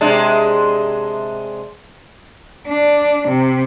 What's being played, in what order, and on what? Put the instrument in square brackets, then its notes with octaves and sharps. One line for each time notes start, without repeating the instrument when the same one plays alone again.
[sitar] C3 G#3 D4
[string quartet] D4
C3